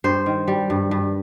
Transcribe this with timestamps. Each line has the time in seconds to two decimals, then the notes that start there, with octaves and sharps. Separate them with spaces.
0.04 G2 C5
0.26 D#3
0.48 G3
0.70 G2
0.91 G2